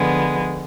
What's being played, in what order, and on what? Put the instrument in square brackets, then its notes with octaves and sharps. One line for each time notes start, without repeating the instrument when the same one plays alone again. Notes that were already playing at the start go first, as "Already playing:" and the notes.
Already playing: [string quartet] D3 F3 G#3 B3